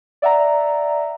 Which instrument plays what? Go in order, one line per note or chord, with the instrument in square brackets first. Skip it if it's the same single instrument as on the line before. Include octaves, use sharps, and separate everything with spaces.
[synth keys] D5 E5 F#5 A#5